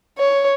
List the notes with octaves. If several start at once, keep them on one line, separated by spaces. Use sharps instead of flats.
C#5